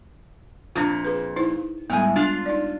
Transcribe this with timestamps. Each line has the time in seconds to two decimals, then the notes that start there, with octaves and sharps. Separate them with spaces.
0.76 F2 A#2 D4 F4
1.05 G#4 B4
1.36 D#4 E4 C5
1.90 A2 G3 G#3 B3 G#5
2.16 D4 F4
2.46 D#4 D5